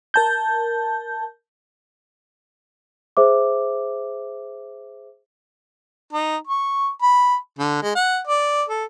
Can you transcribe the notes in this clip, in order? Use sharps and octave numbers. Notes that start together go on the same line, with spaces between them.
A#4 A5 G6
G#4 C5 E5 D6
D#4
C#6
B5
D3
G#3
F#5
D5
A4